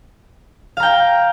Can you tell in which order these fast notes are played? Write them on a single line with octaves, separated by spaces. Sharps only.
F5 A#5 G5